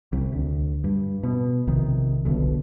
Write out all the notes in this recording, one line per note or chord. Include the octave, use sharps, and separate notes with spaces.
C2
D2
G2
B2
A#1 C3 D#3
D#1 B1 B2 D3